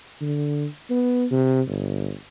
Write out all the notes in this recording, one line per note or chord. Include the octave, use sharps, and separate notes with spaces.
D3
B3
C3
G1